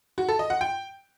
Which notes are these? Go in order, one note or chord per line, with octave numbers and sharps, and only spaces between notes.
F#4
A4
D#5
F#5
G5